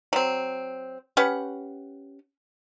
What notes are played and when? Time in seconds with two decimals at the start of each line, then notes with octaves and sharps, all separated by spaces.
0.13 F#3 C4
1.17 C#4 G4 B4 F#5